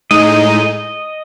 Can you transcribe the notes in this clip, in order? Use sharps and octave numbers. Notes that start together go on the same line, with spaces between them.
A2 G#3 D#4 D#5